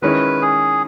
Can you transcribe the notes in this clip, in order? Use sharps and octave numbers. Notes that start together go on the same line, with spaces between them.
D#3 G#3 C#4 E4 B4
G#4